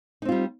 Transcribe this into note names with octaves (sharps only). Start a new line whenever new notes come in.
G3 C4 D#4 F4